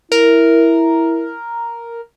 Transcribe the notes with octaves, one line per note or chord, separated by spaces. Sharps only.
E4 A#4